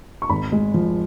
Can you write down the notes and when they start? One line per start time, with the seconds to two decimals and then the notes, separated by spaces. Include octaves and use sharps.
0.22 C#6
0.30 G#1 B5
0.52 G#3
0.74 F3